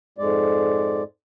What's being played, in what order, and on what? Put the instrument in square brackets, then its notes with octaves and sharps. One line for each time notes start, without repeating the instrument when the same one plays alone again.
[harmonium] F2 G#2 G#3 D5